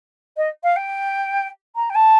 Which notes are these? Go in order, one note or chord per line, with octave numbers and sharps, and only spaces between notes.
D#5
F5
G5
A#5
G5
A5